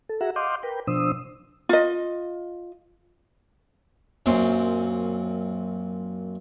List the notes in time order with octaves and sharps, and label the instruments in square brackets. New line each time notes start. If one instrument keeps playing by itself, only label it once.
[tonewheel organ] A4
F#4 G#4 E5 F#5 A#5
D#5 F5 F#5 C6 D6 G6
A#4 B4 G5
B2 F3 D4 C5 D#6 E6
[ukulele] F4 D#5
[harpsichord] F#2 A#2 C4 C6